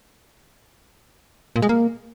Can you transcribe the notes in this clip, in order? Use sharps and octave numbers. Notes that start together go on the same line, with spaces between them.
A#2
G#3
A#3